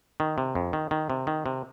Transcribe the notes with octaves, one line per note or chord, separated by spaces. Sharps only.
D#3
C3
F2
D#3
D#3
C3
D#3
C3